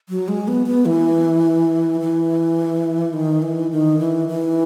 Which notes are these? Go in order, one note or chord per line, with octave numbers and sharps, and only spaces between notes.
F#3
G#3
B3
B3
E3
E3
D#3
E3
D#3
E3
E3